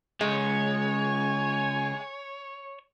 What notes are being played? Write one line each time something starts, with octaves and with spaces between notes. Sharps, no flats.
C#2 G#3 C#5 G#5